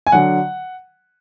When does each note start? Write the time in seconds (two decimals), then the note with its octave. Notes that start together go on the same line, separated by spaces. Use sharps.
0.07 G#5
0.12 D3 F#3 F#5